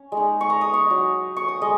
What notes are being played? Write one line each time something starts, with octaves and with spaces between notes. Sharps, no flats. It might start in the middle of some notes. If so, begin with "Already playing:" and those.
Already playing: C#4
G#3
D#4
C#6
A#5
D#6
C#6
F#3 D#4
C#6
D#6
G#3 D#5